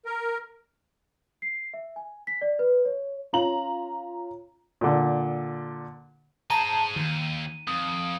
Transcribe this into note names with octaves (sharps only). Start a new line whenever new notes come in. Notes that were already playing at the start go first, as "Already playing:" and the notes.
A#4
C7
E5
G#5
B6
D5
B4
C#5
C#4 F4 A#5 F#7
A#2 D3
G#3 C5 A5 A#5 D#7
D#2 D#3
F2 D#6